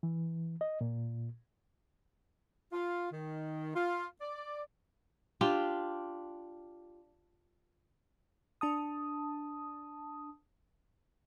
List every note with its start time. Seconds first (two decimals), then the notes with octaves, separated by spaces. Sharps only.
0.03 E3
0.61 D#5
0.81 A#2
2.72 F4
3.12 D#3
3.75 F4
4.21 D5
5.41 D4 F4 G4 G5
8.61 D4 A5 D#6